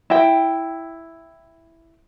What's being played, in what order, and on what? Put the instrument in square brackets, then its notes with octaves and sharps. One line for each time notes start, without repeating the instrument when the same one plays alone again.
[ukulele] E4 G5